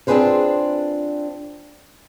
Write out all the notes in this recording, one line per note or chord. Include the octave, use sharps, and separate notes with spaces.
C4 D4 F4 G#4 B4 C5